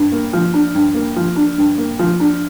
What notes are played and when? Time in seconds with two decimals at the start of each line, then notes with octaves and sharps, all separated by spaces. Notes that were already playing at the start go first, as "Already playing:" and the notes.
Already playing: G2
0.12 A#3
0.33 F3
0.54 D4
0.74 G2
0.95 A#3
1.16 F3
1.36 D4
1.58 G2
1.78 A#3
1.99 F3
2.20 D4